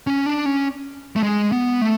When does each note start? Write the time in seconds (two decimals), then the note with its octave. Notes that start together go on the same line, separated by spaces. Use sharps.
0.07 C#4
0.26 D4
0.46 C#4
1.16 A3
1.23 G#3
1.52 B3
1.81 A3